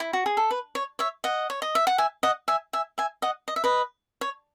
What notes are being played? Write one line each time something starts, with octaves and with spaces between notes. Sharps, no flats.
E4
F#4
G#4
A4
B4
C#5
C#5 E5
D#5 F#5
C#5
D#5
E5
F#5
E5 G#5
D#5 F#5
E5 G#5
E5 G#5
E5 G#5
D#5 F#5
D#5
E5
B4 D#5
C#5